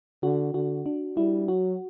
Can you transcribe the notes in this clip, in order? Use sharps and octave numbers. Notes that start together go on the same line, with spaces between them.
D3 F#4
D3 F#4
D4
G3 E4
F#3 F#4